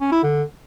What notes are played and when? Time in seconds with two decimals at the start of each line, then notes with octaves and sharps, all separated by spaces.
0.01 C#4
0.12 E4
0.23 D3